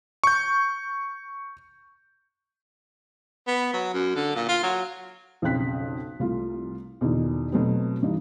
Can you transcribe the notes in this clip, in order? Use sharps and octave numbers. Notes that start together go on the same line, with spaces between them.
C#6 G6
B3
F#3
F#2
D3
A#2
F4
F#3
B1 F2 C#3 G5 F#6 B6
C2 A3 F4
E2 B2 D3 D#3 D#4
B2 F#3 A3 B3 C4
G2 E3 D#4